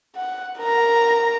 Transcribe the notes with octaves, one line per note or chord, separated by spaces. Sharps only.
F#5
A#4 A#5